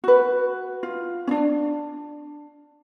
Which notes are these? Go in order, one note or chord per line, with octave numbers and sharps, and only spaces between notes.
F#4 B4
F4
C#4 D4